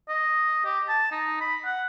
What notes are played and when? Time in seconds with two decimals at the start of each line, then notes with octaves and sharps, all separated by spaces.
0.09 D#5
0.65 G4
0.88 A5
1.11 D#4
1.40 B5
1.65 F#5